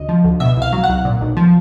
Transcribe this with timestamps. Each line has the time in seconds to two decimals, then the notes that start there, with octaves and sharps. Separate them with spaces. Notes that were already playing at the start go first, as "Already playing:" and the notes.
Already playing: D2 C#3 D#5
0.09 F3
0.24 D2
0.40 B2 E5
0.57 C2 F5
0.73 F#3
0.84 F#5
0.89 C2
1.05 A#2
1.21 B1
1.37 F3